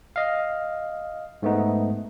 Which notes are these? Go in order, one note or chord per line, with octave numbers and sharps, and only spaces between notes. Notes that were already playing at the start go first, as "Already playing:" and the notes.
D#5 F5
G#2 A3 B3 D#4